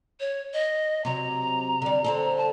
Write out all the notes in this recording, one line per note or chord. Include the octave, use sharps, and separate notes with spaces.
C#5
D#5
C3 F#3 A#5
D3 G3
D3 C4 A4
A5